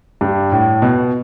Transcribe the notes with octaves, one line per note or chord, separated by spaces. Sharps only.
G2
A2
B2